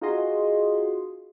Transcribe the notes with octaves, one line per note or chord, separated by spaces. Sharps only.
D#4 F4 F#4 G#4 D#5 C6